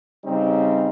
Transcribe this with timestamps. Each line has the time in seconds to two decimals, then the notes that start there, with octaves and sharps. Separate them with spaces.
0.25 C#3 G3 C4 D#4